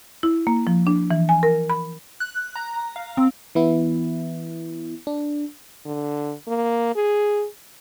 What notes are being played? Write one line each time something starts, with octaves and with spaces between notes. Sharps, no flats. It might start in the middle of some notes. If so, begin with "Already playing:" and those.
E4
A#3
F3
D4
E3
G#5
A#4
B5
F#6
A#5
F5
C4
E3 B3 E4
D4
D3
A#3
G#4